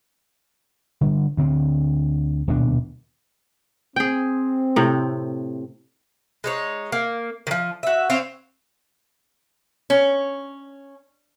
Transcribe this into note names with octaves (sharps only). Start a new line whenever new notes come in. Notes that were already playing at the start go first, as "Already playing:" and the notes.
D3 G3
D2 D3 C4
D#1 D2 B2 D4
C4 G#4 G5
A2 C3
G#3 D#4 C#5
A#3
D#3 F3
F#4 E5
C4 C5 C#5 F5
C#4